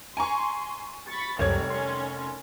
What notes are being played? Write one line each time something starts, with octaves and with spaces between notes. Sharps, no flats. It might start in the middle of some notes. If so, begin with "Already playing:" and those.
G#5 A#5 C6 C#6
B5 C#6 A6
F1 C#2 F#2 D#3 G3 C4 C#5 G#6
D#3 C#4 C6